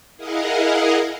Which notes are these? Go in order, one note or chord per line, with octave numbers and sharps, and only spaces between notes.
E4 G#4 A#4 D#5 F5 F#5